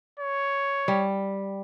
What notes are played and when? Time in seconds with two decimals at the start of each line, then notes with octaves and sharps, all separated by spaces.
0.20 C#5
0.88 G3